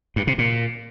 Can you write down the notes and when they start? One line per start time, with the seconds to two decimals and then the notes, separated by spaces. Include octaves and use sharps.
0.16 G2
0.27 C3
0.38 A#2